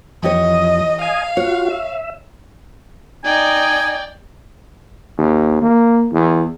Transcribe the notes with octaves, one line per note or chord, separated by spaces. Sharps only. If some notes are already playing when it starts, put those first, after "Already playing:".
F2 E3 G4 C#5 D#5
D#5 F5 G#5
F4 F#4 C#5
E5
D#4 D5 D#5 G5 G#5
D#2
A#3
E2